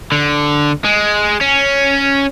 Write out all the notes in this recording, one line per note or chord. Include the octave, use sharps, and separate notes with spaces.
D3
G#3
C#4